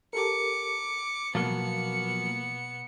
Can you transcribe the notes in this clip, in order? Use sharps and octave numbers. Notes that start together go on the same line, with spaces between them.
G4 A4 A#4 D6 C#7
B2 F3 F#3 A#3 B3 C#7